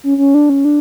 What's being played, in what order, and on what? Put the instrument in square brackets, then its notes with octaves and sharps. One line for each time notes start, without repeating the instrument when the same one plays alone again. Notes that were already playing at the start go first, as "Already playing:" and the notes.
[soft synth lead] C#4
C#4
D4
C#4
D4